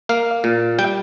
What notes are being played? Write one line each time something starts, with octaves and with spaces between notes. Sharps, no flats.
A#3 F5
A#2
G3 G5